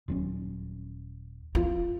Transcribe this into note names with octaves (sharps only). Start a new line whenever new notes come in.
D#1 F#3 C#4
F4